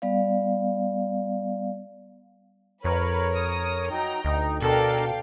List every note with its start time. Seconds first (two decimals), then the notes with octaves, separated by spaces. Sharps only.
0.02 G3 B3 D5 F5
2.84 F2 A#4 B4 C#5
3.36 D#6
3.90 F#3 D#4 G5 A#5
4.25 D2 D#4
4.62 B2 D4 A4 A#4 F5 G5